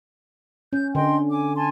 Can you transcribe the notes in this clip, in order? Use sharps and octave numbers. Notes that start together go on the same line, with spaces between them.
C#4 G6
D3 D#5 G5 C6
G#5 D6
G#5 A5 C6